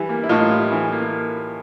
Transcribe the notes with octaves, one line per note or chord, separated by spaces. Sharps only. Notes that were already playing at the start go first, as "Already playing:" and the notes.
Already playing: E3 G3
A#3
E4
A2 D#4 F4
G3
E3
A#3